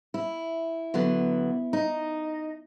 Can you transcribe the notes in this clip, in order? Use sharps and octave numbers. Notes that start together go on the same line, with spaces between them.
E4
D3 F#3 B3
D#4